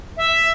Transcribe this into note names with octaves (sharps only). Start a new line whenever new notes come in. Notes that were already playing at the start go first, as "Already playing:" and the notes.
E5